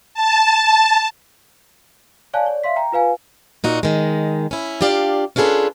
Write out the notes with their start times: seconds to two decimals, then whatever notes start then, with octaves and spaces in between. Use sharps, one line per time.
0.14 A5
2.34 C#5 D5 F5 G#5 A5 F#6
2.46 C#5 D5
2.63 E5 F5 C6 B6
2.76 G5 A#5
2.92 F4 B4 F5 G#5
3.64 A#2 D#4 F#4
3.83 D#3 G#3
4.51 C#4 E4
4.81 D4 F4 G4 D5 F5
5.36 C#4 D4 F4 G#4 A4 B4